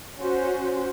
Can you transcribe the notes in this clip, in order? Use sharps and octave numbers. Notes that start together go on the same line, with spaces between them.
C#4 F#4 C5